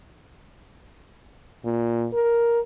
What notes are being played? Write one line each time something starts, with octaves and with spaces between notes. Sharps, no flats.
A#2
A#4